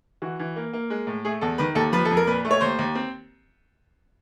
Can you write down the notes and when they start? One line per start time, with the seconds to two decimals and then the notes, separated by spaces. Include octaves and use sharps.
0.22 E3 F#4
0.39 E3
0.56 A#3
0.73 A#3
0.90 G#3
1.07 A2
1.25 A3 G#4
1.41 E2 A4
1.58 D#3 B4
1.75 D#2 A4
1.92 F3 B4
2.05 A4
2.11 F2
2.17 A#4
2.27 A#2 B4
2.45 A3
2.51 C#5
2.61 D#2 C5
2.79 D#2
2.95 C4